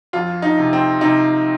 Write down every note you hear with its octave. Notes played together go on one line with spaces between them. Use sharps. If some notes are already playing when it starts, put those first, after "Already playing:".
F2 F4
D#4
C3
C4
C3 D#4